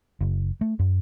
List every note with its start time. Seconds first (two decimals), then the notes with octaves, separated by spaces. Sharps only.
0.21 F#1
0.61 A3
0.79 F#2